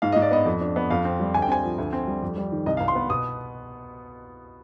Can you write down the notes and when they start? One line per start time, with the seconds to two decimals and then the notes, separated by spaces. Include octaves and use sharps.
0.02 G#2 F5
0.12 G#2 D#5
0.22 D5
0.31 B3 D#5
0.46 F2
0.61 D4
0.76 B3
0.90 F2 F5
1.05 C4
1.20 G3
1.34 D2 G#5
1.42 G5
1.48 C4 G#5
1.63 F3
1.78 D2
1.93 C4
2.08 G3
2.22 F2
2.37 G3
2.52 D#3
2.66 C2 D#5
2.77 F5
2.80 C2
2.88 C6
2.95 B3
3.10 B2 D#6